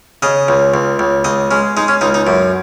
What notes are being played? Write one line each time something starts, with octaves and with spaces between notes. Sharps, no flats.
C#3 D#5
C#2
C#2
C#2
C#2 D#5
G#3 C#4
G#3 D#4
C#4
C#2 D#4
D#4
F#2